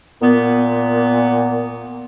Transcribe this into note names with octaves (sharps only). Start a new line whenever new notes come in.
A#2 B3